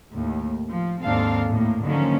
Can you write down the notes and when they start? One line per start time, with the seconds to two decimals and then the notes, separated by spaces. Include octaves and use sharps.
0.15 D#2 A2
0.70 F3
1.04 D#2 G#2 C4 D4 A4 F5
1.49 A2 A#3
1.85 D3 D#3 F3 F#3 A#3 C#4